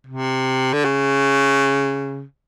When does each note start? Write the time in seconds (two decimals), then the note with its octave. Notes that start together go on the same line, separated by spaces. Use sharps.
0.07 C3
0.73 D3
0.85 C#3